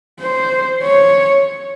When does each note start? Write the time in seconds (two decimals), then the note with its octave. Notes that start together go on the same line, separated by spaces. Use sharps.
0.22 C5
0.83 C#5